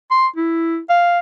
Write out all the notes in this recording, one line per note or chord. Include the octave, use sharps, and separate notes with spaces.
C6
E4
F5